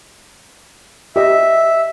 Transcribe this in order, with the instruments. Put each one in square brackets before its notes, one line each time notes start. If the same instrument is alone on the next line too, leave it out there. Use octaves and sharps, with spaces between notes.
[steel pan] G4 D#5 [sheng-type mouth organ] E5